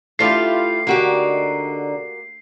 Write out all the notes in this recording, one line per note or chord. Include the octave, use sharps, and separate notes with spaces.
A3 D4 E4 F4 G4 B4 C7
D3 A#3 D#4 F#4 G4